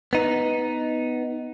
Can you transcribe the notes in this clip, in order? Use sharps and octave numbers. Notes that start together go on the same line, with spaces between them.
B3 D#4